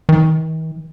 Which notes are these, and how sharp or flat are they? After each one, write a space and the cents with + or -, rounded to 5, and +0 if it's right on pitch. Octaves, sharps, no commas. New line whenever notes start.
D#3 +45